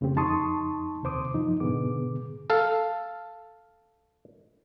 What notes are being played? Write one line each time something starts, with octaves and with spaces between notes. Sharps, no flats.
F2 C#3 A3 C4 G4
F2 D#4 A5 C6 C#6 D#6
D#2 C3 C5 D6 D#6
F#2 F3 D#4
G#2 B2 D3 B3 G#4 D6
A4 F5